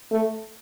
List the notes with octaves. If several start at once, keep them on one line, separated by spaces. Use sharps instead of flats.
A3